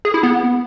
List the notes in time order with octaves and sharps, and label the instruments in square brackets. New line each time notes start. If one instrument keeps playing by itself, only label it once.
[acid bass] G#4
E4
B3